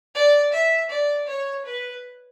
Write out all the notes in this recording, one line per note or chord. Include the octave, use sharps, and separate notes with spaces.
D5
E5
D5
C#5
B4